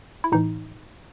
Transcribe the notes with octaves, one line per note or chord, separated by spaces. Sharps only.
E4
A2 E3 D#4